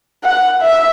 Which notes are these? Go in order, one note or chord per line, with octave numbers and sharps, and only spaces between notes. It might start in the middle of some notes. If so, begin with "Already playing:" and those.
F#5
E5